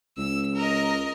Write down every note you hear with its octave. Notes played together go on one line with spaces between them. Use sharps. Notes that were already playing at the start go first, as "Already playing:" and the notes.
C#2 E6
A#4 D#5